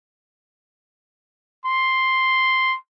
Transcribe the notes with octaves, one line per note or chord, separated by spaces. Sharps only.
C6